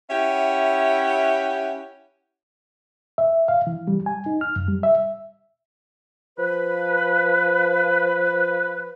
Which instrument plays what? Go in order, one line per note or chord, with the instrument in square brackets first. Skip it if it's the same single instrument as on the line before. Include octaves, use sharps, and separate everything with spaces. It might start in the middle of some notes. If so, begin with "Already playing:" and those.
[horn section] C#4 E4 G4 E5 F#5
[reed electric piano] E5
F5
E3
G3
G#5
D#4
F6
F#2
G3
E5
[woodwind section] F3 B4